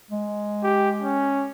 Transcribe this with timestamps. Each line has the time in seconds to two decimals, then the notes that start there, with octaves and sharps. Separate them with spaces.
0.11 G#3
0.63 G4
1.02 C#4